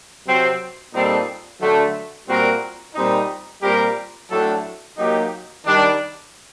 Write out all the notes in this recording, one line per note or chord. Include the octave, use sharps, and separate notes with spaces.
C3 F#3 C4
A#2 G3 C4 D#4 A4
D3 F#3 A3
A#2 G3 C4 F#4 A#4
A#2 G3 C4 D#4
A#2 G3 C4 G4 A#4
A2 F#3 A3 D4 A4
F#3 A#3 D#4 G4
D#3 G3 D4